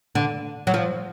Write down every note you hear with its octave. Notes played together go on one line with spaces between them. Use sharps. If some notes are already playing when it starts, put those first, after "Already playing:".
D3
F#3
F3